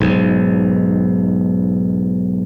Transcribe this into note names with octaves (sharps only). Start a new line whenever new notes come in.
B1 G#2